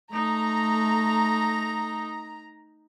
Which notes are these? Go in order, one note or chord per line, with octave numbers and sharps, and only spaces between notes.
A3 D#4 A#5